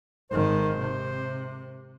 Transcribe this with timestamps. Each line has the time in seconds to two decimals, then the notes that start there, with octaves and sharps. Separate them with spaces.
0.31 G#1 D#3 C5
0.79 C3